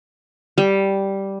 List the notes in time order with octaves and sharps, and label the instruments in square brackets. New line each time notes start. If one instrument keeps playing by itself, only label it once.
[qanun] G3